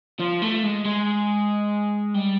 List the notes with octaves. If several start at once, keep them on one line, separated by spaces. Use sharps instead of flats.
F3
A3
G#3
G#3
G3